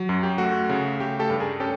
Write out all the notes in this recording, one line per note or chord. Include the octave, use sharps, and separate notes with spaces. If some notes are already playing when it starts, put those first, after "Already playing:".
Already playing: F#3
F#2
G4
A3 F#4
C#3
A3 G4
G4 A4
G2
G#4 A#4
C#4 G4 A4